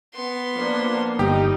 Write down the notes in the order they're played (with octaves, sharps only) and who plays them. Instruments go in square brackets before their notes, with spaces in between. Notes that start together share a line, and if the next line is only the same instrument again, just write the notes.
[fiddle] B3 C6
[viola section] F3 A#3 D4
[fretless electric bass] G1 [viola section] G3 D#4 [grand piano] G4